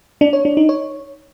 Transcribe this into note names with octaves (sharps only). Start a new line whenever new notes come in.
D4
C#5
D4
D#4
C#5